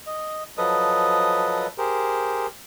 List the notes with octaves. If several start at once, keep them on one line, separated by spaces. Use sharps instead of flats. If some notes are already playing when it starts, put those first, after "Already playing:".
D#5
F3 F#3 A4 B4 D#5 D#6
G4 G#4 A#4 C5